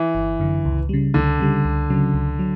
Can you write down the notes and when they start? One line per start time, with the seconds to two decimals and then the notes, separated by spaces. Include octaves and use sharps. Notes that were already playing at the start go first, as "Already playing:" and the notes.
Already playing: E3
0.15 G1
0.40 F#2 D3
0.65 C#2
0.89 C#3 G3
1.14 C#2 D3
1.40 C#3 G3
1.65 C#2
1.90 C#3 F#3
2.14 C#2
2.39 F#3